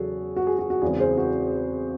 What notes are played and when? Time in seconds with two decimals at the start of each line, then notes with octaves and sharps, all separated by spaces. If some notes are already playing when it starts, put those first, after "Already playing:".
Already playing: E2 C#3 F#3 F#4 G#4 A4
0.36 F#4
0.47 G#4
0.59 F#4
0.70 F#4
0.82 E2 C#3 E3 G#3 C4 G#4
0.99 G#4 C5
1.17 F#4